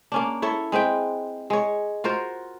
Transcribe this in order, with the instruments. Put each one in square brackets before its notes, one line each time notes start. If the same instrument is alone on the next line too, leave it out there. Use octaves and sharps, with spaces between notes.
[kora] A#3 C#4 D4
E4 A4 C#5
G#3 C4 B4 G5
G#3 C#5
F4 F#4 A#4 C5